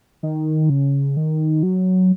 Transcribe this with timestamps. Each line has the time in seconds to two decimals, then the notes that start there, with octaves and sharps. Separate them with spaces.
0.23 D#3
0.70 C#3
1.17 D#3
1.63 F#3